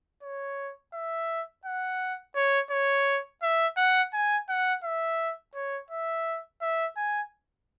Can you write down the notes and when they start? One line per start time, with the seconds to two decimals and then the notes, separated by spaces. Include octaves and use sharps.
0.23 C#5
0.94 E5
1.66 F#5
2.35 C#5
2.71 C#5
3.42 E5
3.77 F#5
4.13 G#5
4.49 F#5
4.84 E5
5.55 C#5
5.91 E5
6.62 E5
6.97 G#5